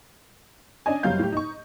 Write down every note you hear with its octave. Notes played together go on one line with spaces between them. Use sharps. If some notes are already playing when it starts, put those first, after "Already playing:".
C#4 D4 D#5 G#5
F#1 F#3 G3 F5 G6
A2 G4
D#4 C#6